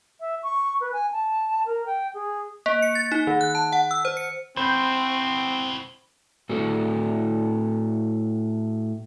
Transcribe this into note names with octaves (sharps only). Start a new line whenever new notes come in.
E5
C#6
B4
G#5
A5
A#4
G5
G#4
A#3
C#7
A6
D#4
D#3
F#6
A5
F#5
E6
C5
C#7
C4 E4 F#4 C5 B5 G6
A2 F#4 A4